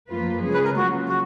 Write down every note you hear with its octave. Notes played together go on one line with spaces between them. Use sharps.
F#2 F3 A#3 F4 B4
C#3 G#3 C#4 G#4
B4
A#4
C#3 F#3 A#3 F4 F#4
F#4